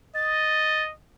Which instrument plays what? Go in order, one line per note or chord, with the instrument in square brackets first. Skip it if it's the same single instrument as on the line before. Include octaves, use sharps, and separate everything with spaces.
[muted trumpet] D#5 [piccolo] A6